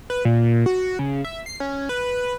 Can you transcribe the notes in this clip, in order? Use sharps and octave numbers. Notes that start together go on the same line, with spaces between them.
B4
A#2
F#4
C#3
E5
C7
C#4
B4